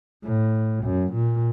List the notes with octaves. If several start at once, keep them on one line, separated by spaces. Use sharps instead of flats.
A2
F#2
A#2